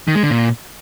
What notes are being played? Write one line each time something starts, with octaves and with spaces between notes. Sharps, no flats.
D#3
G#3
D3
A#2